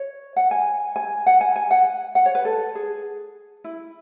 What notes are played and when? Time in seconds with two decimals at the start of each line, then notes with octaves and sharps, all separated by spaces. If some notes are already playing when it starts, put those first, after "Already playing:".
Already playing: C#5
0.36 F#5
0.51 G#5
0.96 G#5
1.26 F#5
1.41 G#5
1.56 G#5
1.71 F#5
2.15 F#5
2.26 C#5
2.35 B4
2.45 A4
2.75 G#4
3.64 E4